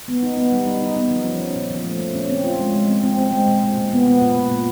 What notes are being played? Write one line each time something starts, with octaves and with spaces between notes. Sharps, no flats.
B3
D#4
B3
G3
D#4
D#4
B3
F3
C#4
C#4
A#2
F3
A3
A#2
C#4
C4
F4
G#3
G#3
C4
C4
C4
G#3
A#2
A#2
A#2
B3
B3
A#2
A#2
A#2